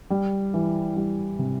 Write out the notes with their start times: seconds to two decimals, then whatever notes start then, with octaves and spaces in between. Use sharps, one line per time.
0.10 G3
0.54 E3
0.96 G3
1.39 C3